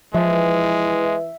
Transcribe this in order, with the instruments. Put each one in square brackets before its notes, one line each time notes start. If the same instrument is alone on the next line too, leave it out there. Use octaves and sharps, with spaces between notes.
[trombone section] E3 [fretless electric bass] F3 [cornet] G#3 [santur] E5